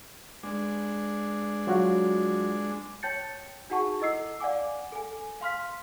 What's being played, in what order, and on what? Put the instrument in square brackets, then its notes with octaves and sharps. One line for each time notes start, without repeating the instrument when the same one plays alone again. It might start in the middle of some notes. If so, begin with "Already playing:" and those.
[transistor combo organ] G#3 D4
[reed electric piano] F#3 F4 F#4
[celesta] C#5 G5 A5 G6 A6 C#7
D#4 F#4 G#4 F#5 A5 C#6
E4 A4 D#5 E6 C7
D5 F5 F#5 G#5 D6
A4 G#5
F5 C6 F6 B6